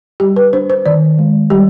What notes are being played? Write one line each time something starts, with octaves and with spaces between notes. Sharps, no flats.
G3 G4
B4
D4 C5
C5
D#3 D5
G#3
G3 G4